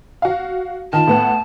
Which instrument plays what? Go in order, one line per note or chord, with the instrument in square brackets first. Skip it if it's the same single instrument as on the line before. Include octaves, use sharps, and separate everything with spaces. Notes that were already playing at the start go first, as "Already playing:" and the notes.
[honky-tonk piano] F#4 F5
[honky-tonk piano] D#3 F4 [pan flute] A5
[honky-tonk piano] A2 B3 F#5